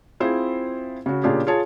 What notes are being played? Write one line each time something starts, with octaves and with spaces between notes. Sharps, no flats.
C4 E4 F4 G#4 C5
C#3 F#4
A#2 C#3 D4 F4 G4 G#4
F4 G#4 C#5 A5